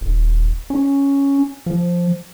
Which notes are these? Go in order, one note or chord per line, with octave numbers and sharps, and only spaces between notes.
D#1
C#4
F3